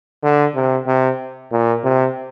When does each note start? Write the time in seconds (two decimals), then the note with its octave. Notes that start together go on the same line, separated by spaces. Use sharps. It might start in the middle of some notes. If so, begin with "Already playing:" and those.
0.23 D3
0.55 C3
0.87 C3
1.52 A#2
1.84 C3